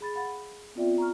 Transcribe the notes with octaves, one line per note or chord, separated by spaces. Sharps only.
G#4 B5 A6
F5 F#5 B5 A6
B3 C4 F4 D5 E5 G5
A#5 C#6 F6